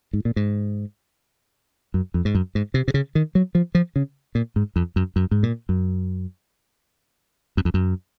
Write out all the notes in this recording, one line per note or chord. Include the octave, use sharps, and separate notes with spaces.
G#2
A#2
G#2
F#2
F2
G#2
F#2
G#2
C3
C3
C#3
D#3
F#3
F3
F3
C#3
A#2
G#2
F2
F#2
F#2
G#2
A#2
F#2
F#2
F2
F#2